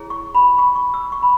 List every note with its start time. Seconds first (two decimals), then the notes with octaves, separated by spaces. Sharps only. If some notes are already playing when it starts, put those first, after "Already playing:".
Already playing: E4 G#4 C#5
0.10 C#6
0.35 B5
0.59 C#6
0.76 C#6
0.94 E6
1.12 C#6
1.23 B5